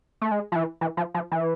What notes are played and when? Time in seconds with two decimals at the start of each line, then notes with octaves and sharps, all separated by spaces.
0.21 A3
0.32 G#3
0.52 F3
0.56 E3
0.81 E3
0.97 F3
1.14 F3
1.31 E3